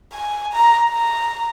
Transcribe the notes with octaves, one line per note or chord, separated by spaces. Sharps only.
G#5
A#5
A#5